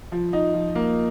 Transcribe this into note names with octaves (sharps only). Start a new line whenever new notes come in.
F3
D#4
F3
A#3